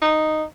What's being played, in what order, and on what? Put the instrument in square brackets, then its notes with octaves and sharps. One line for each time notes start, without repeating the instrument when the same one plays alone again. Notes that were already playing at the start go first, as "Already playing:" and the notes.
[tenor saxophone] D#4